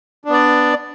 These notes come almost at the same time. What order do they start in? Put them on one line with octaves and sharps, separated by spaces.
D4 B3 D5